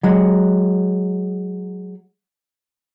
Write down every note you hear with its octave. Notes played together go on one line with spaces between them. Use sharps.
F#3 G#3